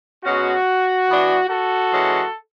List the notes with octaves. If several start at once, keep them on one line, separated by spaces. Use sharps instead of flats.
B2 G#3 C#4 F#4
E3 B3 D4
F#4 A4
E3 G#3 C#4